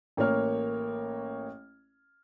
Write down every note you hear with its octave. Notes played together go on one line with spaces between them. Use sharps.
A1 A#3 A#4 C#5 F6